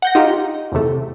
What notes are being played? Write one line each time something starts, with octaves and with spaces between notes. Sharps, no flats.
F#5 G6 A#6
D#4 F4 G4
E2 A2 C3 A3